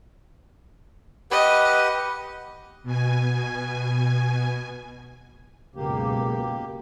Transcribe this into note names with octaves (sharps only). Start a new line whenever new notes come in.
G4 B4 D#5 F#5
B2 G#5
C#2 F#2 B2 A#3 G4